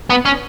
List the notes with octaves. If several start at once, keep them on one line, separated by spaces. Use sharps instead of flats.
B3
C#4